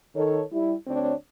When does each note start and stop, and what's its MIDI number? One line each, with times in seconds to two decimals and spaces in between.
0.16 0.42 51
0.16 0.42 69
0.16 0.42 73
0.52 0.74 55
0.52 0.74 64
0.87 1.13 38
0.87 1.13 60
0.87 1.13 62
0.87 1.13 73